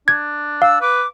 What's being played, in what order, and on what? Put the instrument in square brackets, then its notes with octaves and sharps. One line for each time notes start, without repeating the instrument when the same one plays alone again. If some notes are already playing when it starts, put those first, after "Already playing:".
[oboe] D4 [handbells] G#6
[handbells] F5 [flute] E6
[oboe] B4 [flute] D6